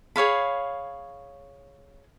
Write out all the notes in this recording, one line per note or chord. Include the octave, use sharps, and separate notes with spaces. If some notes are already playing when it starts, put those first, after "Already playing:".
G#4 C#5 F5 B5